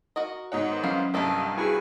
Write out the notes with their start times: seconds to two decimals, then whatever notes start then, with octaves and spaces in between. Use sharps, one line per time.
0.16 F#4 A#4 D#5
0.52 G#2 D#4 C#5 F#5
0.70 D#3 B3 C5
0.83 F#3 C#4 E4 C#5 F5 C7
1.14 C2 G2 A#3 A4 A#4 D#5 E5
1.58 E4 F#4 G#4 B4 G#5 C#6